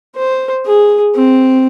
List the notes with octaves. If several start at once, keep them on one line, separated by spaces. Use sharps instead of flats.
C5
G#4
C4